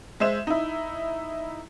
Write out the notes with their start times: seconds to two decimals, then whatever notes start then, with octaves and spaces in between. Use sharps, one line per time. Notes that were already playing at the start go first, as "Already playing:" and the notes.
0.20 G#3 C5 E5 E7
0.47 D#4 E4